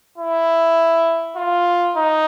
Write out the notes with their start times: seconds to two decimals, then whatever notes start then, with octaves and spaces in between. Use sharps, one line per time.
0.18 E4
1.36 F4
1.97 D#4